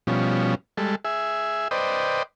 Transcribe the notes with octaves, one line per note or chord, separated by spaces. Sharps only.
B2 F3 G3 C#4
G3 G#3 A4
G#4 E5
B4 C5 D5 D#5 G5